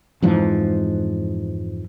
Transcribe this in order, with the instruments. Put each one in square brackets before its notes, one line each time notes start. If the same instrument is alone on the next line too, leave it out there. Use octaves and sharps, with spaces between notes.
[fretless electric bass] F2 G#2 E3 F3